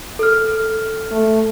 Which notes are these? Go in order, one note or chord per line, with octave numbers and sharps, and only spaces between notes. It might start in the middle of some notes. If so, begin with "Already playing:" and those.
A4 F6
A3